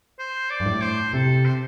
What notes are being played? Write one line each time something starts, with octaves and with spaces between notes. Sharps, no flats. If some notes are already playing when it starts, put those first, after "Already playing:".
C5
D5
G2
A2
C5
C3 A4
C5